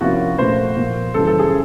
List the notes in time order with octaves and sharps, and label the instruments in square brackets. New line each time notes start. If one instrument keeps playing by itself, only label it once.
[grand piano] C3 F3 A#3 C#4 E4 [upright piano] F#4
[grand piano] A#2 F3 A3 [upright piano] C5
[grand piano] A#2 F3 A#3
[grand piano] F#2 C#3 E3 G3 [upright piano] A4
[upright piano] A4
G#4